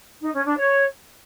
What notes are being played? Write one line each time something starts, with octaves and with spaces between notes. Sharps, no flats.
D#4
C#4
D4
C#5